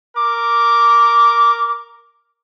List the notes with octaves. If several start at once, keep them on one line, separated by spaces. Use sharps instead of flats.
A#4 D6